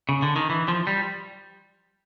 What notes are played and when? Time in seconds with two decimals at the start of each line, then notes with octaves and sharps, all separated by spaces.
0.09 C#3
0.22 D3
0.36 D#3
0.50 E3
0.68 F3
0.87 G3